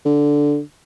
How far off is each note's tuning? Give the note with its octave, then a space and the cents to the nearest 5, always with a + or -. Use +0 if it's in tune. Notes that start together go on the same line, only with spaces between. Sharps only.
D3 -5